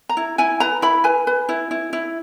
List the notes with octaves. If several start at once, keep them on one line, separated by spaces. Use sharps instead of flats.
A#5
E4
E4 G#5
B4 A#5
E4 B5
B4 G#5
B4
E4
E4
E4